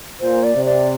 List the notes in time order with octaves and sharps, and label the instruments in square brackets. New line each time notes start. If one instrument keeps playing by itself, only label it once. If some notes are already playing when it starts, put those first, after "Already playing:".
[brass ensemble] A#2 [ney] C5
[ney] D5
[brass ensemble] C3
[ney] D5